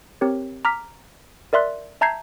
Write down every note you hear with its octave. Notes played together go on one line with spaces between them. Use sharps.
C4 G4 A#4 C#5
A#5 D6 F6 B6
A#4 D5 E5 C6 F#6
E5 A5 A#5 G6 G#6 C7